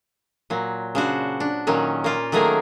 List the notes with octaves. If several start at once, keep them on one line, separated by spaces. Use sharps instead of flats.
A#2 F#3
C#3 D4 F#4 C5
D4
A#2 D#3 F#3 C#4
A#3 F4
D#3 F#3 A3 A#3 G#4 A#4